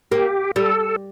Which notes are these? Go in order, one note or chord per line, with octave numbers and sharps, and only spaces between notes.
A#3 G4
G3 A4